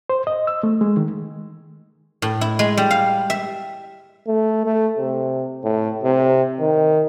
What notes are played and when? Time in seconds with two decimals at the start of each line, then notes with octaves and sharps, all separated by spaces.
0.10 C5
0.27 D#5
0.47 E6
0.63 A3
0.81 G#3
0.97 D#3
2.22 A2
2.41 E4
2.59 G#3
2.77 G3
2.91 F5
3.30 E5
4.27 A3
4.66 A3
4.98 C3
5.64 A2
6.04 C3
6.60 D#3